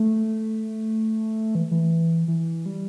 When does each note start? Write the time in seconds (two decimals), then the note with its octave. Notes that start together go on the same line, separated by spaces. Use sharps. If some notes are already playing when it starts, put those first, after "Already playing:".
Already playing: A3
1.55 E3
1.71 E3
2.28 E3
2.66 G3